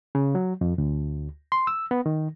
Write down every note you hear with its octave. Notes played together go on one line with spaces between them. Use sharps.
C#3
F#3
F2
D2
C6
E6
B3
D#3